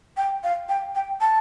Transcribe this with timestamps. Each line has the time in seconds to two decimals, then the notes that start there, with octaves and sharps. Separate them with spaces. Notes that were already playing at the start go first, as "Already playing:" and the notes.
0.17 G5
0.44 F5
0.69 G5
0.95 G5
1.21 A5